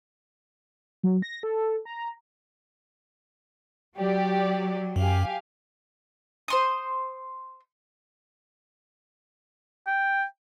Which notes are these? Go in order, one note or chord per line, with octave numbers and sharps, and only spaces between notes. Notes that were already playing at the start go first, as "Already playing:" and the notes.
F#3
A#6
A4
A#5
F#3 G4 D5
F#2 G4 F5 G#5
C5 C6 D#6
G5